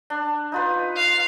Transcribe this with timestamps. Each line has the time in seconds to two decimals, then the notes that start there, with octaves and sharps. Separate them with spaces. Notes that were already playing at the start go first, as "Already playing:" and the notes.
0.10 D4
0.52 D#4 F4 B4
0.96 F5